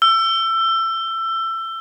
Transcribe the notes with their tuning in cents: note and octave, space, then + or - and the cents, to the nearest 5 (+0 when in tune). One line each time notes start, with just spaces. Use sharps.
E6 +25